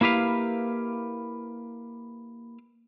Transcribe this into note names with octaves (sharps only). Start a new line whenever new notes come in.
A#3 E4 G4 B4 F5